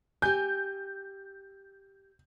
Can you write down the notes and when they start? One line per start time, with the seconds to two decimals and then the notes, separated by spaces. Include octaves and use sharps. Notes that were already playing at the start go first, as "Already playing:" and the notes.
0.22 G4 G#5 G6